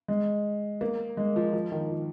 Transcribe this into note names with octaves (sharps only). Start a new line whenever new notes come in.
G#3
A#3
G#3
F3
F3
D#3
F3